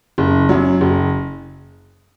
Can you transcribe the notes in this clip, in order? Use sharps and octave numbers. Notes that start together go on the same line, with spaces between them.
F#1
F#2 F#3
F#1